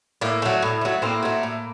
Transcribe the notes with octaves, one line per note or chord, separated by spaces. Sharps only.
A2 A#3
F#3 A3
A2
F#3 A3
A2 A#3 C4
F#3 A3
A2